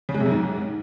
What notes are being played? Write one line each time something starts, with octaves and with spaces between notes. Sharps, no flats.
C#3
G#3
C3
F#2
G#2